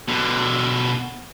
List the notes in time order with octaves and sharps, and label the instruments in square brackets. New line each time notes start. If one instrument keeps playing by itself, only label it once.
[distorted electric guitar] B2 D3